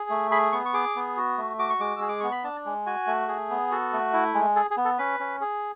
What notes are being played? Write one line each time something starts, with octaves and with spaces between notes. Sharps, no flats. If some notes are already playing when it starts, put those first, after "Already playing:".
Already playing: G#4
A3
G#4 B5
B3 C#6
C#6
G#4 D6
B3
F#4
A3
F#4 D6
C#6
G#3 D6
E6
G#4
D6
B3 C#6
B5
D4 A5
G#3
F#4 G#5
A3
G#4
B3
F#4 A4
A3
E4
G#3
G#4 A4
G#4
B3
A4
C#4 B4
C#4
G#4